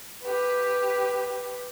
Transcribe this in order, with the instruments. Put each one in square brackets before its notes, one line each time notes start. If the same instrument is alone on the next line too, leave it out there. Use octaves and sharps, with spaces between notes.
[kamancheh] G4 B4